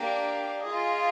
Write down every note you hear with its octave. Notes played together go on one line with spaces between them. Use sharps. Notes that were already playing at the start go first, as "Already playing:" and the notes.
Already playing: A#3 D4 G4 A#4 F5
F4 G#4 D#5